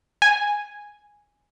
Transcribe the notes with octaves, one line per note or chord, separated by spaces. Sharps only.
G#5